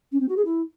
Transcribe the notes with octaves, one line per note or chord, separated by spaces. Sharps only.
C#4
C4
F#4
G#4
E4